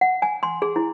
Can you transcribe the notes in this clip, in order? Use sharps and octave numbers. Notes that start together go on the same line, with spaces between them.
F#5
G#5
C6
G#4
E4